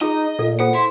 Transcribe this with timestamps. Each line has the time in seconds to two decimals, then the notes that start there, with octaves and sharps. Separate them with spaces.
0.01 D#4 F4 G#4 D#5
0.39 A#2 A4
0.60 F4 A4 C5 F#5
0.75 E4 C6